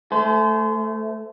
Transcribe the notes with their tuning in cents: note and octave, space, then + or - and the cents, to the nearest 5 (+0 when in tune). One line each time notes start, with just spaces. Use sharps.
A3 +0 C5 -30 G#5 +45